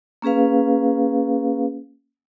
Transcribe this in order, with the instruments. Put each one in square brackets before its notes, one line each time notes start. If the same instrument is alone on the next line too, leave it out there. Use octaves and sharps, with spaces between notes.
[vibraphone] A#3 C#4 G#4 B4 F5